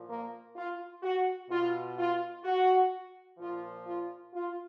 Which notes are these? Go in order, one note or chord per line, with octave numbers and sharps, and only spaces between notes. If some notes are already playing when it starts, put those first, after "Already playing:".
Already playing: A#2 F3
A#3
F4
F#4
B2 F4
F4
F#4
A#2 F3 F4
F4
F4